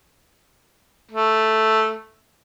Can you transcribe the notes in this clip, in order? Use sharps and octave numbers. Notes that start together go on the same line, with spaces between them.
A3